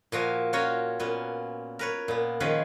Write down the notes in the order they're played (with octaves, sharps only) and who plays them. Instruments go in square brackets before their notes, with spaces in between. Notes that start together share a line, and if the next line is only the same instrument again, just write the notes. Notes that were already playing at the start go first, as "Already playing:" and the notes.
[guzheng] A#2 F3 F#4 A#4 G#5
C#4 F4 F#4 A#4 C#5 G#5
A#2 B3 C#4
A#4 B4 C#5
A#2 B3
D#3 F3 C#4 G#4 B4